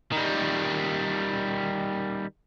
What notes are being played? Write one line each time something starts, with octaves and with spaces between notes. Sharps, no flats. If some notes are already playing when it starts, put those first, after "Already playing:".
D#3 G3